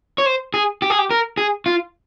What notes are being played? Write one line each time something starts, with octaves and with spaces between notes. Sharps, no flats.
C#5
C5
G#4
G4
G#4
G4
A#4
G#4
F4